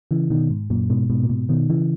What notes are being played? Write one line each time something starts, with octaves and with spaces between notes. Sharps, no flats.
C#3 E3
B2 D#3
G#2
F#2 A#2
G#2 B2
G#2 B2
A#2
G#2 B2
B2 D#3
C#3 E3